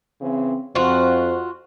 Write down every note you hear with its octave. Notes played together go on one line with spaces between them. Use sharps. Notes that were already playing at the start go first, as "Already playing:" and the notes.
C#3 E3 C4
F2 F4 F#4 C5